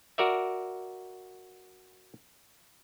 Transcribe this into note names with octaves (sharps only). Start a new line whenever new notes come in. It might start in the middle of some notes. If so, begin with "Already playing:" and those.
F#4 A#4 D5 E5